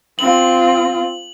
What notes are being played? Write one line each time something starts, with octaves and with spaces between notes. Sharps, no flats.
C4 F4 F#7